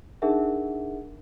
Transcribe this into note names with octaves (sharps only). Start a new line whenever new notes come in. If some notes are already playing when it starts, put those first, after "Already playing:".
D4 D#4 G#4 A#4 E5 F#5